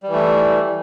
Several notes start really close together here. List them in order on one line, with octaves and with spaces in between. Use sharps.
G3 E3 A3